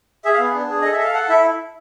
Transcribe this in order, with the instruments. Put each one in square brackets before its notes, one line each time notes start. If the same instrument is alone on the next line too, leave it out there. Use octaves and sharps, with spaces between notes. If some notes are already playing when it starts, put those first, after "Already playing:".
[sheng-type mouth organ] G#4 E5
F5
B3
D4
G#4
A4 D#5
E5
A4 F5
A4 F#5
E4 E5